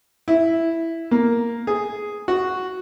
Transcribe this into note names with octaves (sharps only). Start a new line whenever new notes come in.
E4
A#3
G#4
F#4